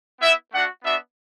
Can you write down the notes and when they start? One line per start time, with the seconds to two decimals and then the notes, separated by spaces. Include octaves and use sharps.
0.21 B3 E4 E5
0.53 A3 D4 F#4 F#5
0.84 B3 D4 F#4 E5